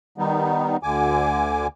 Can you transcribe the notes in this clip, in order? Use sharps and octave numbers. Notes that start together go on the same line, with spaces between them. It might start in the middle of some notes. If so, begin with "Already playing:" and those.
D#3 G3 B3 D#4
D2 D3 G#5 D6